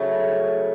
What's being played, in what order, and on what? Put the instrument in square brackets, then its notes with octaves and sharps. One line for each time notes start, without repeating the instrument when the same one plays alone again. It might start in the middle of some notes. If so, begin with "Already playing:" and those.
Already playing: [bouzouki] C#3 F#3 A3